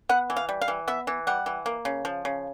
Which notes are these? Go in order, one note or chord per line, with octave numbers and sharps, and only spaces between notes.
B3 F#5
E3
F5
G3
F5
E3
B3 E5
E3
G3 F#5
E3
A#3
C#3
F3
C#3